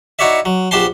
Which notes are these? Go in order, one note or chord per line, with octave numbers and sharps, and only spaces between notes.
D#4 E4 F#4 C#5 D5 E5
F#3
A#1 B3 G4 C5 A5 C6